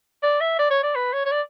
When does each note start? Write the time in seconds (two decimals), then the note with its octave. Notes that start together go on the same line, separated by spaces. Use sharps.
0.23 D5
0.41 E5
0.59 D5
0.70 C#5
0.83 D5
0.95 B4
1.13 C#5
1.25 C#5
1.32 D5